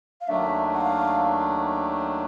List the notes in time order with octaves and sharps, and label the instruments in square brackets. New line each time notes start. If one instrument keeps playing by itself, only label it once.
[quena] F5
[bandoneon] D#2 D#3 F#3 A3 D4 [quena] E5
[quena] F#5
F5